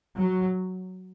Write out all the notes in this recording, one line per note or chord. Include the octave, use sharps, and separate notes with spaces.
F#3